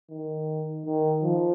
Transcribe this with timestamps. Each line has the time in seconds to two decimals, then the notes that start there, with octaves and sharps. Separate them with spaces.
0.10 D#3
0.86 D#3
1.23 F3